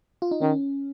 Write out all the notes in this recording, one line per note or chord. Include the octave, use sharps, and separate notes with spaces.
F4
D#4
D#3 C#4